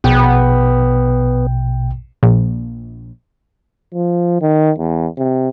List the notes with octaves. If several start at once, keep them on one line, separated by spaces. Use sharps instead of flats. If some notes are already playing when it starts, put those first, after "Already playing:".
A#1 B2 B3 G5
A#1
F3
D#3
E2
C3